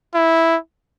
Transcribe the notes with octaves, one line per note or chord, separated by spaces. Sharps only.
E4